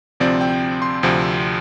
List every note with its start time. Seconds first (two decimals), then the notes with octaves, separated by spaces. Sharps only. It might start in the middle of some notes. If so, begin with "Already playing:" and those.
0.20 D2 C3 F3 C4 D5
0.41 G5
0.82 C6
1.03 D2 C3 F3 C4